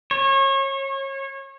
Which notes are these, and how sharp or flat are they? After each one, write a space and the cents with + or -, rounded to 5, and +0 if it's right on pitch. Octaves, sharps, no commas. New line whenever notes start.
C#5 -30